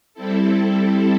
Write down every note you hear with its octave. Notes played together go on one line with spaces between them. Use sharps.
G3 C4 E4 A4